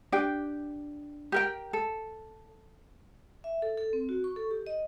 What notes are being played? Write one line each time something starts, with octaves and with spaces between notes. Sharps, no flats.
D4 G4 G5
G4 A#4 G5
A4
E5
A4
A4
C4
F#4
C#6
A4
G4
D#5